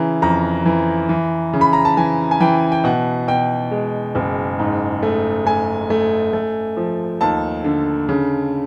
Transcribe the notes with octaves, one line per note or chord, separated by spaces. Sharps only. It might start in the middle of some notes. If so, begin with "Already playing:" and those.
Already playing: C#3 E3 A#5
F2 A#5
E3
E3
C#3
B5
A#5
A5
E3 G#5
G#5
E3 G5
G5
B2 F#5
B2 G5
G#3
F#1
G#2
A3
A3 G#5
A3
A3
F3
D#2 A5
D3
C#3